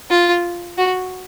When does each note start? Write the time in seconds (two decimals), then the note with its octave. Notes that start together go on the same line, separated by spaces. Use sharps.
0.11 F4
0.78 F#4